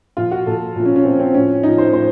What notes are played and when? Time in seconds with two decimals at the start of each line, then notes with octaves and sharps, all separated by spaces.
0.17 A#2 F3 F4
0.31 F#4
0.46 A#2 F3 A4
0.76 A#2 F3
0.85 C#4
0.96 C#4
1.05 A#2 F3 C4
1.19 C4
1.34 A2 F3 C#4
1.63 A2 F3 D#4
1.78 C5
1.93 A2 F3 C5